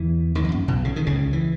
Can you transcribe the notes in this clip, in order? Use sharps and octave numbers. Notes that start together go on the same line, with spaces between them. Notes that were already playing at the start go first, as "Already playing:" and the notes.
Already playing: E2 E3
D#2 D#3
E2
F#2
B1 B2
C#3
D#3
C#2 C#3
E3